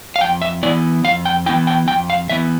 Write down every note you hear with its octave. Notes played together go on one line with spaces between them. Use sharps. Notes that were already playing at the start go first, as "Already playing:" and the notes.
F5
F2 G5
E5
E3 B3 E4 D5
F2 F5
G5
E3 B3 E4 G5
G5
F2 G5
F5
E3 B3 E4 E5